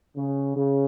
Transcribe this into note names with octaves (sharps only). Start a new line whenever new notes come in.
C#3
C#3